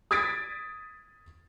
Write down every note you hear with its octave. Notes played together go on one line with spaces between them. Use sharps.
D#6 G#6 A6 B6 D7